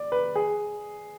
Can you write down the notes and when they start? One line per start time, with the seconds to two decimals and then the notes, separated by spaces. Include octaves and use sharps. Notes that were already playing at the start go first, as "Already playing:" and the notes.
Already playing: D5
0.12 B4
0.35 G#4